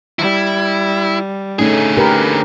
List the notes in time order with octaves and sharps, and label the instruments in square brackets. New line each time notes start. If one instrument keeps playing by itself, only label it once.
[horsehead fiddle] G3 [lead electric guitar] E4
[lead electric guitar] D3 G#4 [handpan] A3 C#4 D#4
[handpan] G4 A#4 B4